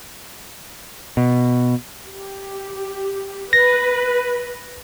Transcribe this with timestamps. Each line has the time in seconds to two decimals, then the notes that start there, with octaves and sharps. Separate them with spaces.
1.17 B2
2.09 G4
3.53 B4 A#6